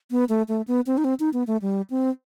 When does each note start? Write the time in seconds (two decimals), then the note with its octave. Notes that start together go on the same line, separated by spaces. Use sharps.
0.11 B3
0.29 A3
0.48 A3
0.68 B3
0.87 C4
0.98 D#4
1.04 C4
1.20 D#4
1.33 B3
1.47 A3
1.62 G3
1.90 C4